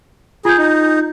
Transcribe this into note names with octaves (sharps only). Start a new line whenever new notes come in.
F4 G#4 G6
D#4